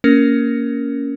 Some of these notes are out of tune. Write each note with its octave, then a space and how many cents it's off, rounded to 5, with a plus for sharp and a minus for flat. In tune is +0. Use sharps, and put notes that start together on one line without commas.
A#3 +0 C#4 +15 A#4 +0